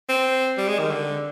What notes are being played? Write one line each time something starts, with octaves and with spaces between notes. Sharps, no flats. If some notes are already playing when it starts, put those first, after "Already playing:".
C4
G3
G#3
D#3
D3